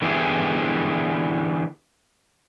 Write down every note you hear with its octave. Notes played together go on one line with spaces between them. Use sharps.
D3 E3 B3 E4 G4 G#4